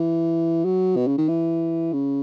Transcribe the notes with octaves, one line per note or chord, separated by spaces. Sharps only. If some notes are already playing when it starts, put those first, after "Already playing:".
Already playing: E3
F#3
B2
C#3
D#3
E3
C#3